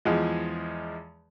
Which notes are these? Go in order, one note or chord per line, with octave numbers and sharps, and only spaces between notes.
E2 F3 G#3